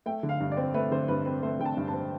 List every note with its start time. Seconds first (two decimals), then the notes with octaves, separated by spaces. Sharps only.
0.06 A3 G5
0.23 D3
0.29 F5
0.40 G2
0.52 D5
0.57 C4
0.74 A3 B4
0.91 D3 C5
1.08 G2 B4
1.25 C4 B4
1.43 A3 C5
1.59 D3 G5
1.65 A5
1.77 G2
1.88 A5
1.93 C4